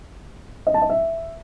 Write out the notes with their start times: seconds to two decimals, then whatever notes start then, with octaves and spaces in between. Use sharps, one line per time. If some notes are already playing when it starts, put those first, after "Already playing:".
0.67 D#5
0.74 A5
0.82 D#5
0.90 E5